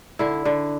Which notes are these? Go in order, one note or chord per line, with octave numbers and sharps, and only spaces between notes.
D3 E4
D3